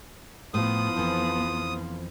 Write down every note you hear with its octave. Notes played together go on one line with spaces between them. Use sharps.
A2 F3 B3 D#6
F2 E3